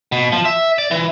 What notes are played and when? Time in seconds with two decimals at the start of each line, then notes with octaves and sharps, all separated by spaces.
0.12 B2
0.32 F3
0.45 E5
0.78 D5
0.91 E3